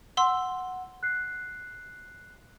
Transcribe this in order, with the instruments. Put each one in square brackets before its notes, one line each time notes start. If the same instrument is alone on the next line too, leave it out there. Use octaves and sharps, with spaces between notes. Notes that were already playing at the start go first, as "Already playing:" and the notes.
[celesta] F#5 [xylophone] C6 E6 G7
[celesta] F#6 C7